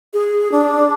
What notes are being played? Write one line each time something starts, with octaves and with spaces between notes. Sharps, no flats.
G#4
D4